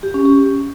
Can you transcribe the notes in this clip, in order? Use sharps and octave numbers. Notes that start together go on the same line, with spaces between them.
G4
C#4
G4